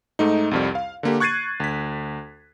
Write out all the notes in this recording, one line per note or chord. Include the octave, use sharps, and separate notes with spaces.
G#2 A3 D#4
C2 F2 G3
F5
D3 A#3 G4
C#6 F#6 G#6 A6 C7 D#7
D2 B6